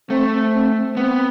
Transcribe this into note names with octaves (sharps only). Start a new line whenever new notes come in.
A3 C4
C4
B3 C4